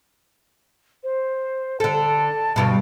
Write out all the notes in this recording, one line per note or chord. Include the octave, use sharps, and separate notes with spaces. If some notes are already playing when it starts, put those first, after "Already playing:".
C5
D3 A4 A5
D2 G2 B2 A5